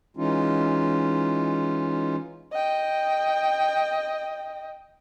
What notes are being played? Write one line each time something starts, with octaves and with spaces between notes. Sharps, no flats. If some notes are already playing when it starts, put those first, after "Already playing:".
E3 G#3 C#4 D#4 F4
D#5 G5